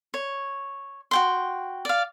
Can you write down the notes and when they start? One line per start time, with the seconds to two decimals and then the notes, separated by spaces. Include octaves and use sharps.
0.14 C#5
1.11 F#4 G5 C6
1.85 D5 F5